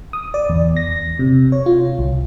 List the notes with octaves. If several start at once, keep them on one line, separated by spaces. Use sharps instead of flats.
D#6
D5
E2
A#6
C3
C#5
F4
C2